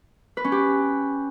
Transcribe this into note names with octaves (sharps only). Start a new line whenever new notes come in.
B4
C#4
G4